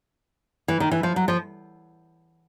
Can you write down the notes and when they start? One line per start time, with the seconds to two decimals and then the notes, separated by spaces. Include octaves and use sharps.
0.68 E3
0.80 D#3
0.91 E3
1.03 F3
1.16 F#3
1.28 F3